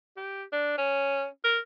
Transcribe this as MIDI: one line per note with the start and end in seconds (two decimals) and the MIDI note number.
0.17 0.43 67
0.52 0.73 62
0.78 1.26 61
1.44 1.59 70